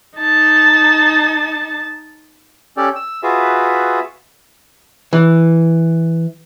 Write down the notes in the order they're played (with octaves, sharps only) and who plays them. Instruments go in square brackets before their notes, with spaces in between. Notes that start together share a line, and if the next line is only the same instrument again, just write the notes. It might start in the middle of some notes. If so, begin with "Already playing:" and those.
[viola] D#4 A5
[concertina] C#4 G4 A4 D5
E6
F4 F#4 G#4 B4 E5
[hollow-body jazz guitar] E3